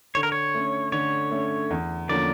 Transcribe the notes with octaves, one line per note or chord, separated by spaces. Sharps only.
D3 C#5
A#4
C#5
A3 C#4
D3 C#5
A3 C#4
E2
D3 F3 A#3 C#4 D5